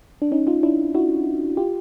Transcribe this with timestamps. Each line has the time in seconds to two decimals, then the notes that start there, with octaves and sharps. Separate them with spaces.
0.22 D4
0.32 C#4 D#4
0.47 D#4 F4
0.63 D4 E4
0.95 E4 F#4
1.57 F4 G4